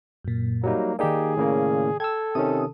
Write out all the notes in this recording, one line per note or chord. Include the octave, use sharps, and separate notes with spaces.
F#2 A#2
F#3 G3 A#3 D#4
D#3 A#3 D#4 G4 G#4 D5
A2 C#3 A#3
A4 G5 A5 E6 G#6
C3 D#3 C#4 D#6